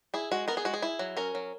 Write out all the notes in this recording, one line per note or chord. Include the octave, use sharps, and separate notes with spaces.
E4 G#4
G#3 F#4
B3 A#4
G#4
G#3 F#4
G#4
E4
F#3
C#4 A#4
F#3